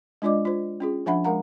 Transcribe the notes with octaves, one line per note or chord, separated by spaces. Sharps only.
G#3 D4 F4 D5 D#5 D6
F4 C5
C#4 F4 G#4
F3 D4 E5 F#5 B5
G#3 A#4 F5 F#5 A#5